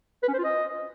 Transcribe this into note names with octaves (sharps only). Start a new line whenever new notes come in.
B4
C#4
C5
F4
D#5